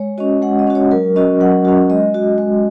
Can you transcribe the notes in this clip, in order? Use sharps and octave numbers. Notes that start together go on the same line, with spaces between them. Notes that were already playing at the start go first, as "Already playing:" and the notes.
Already playing: G#3 C#5
C#4 F#4 D#5
G#3 F#5
D#5
C#4 F#4
C#5
F#3 A#4
C#4 F#4 D#5
F#3 F#5
C#4 F#4
G#3 D#5
F#4
G#3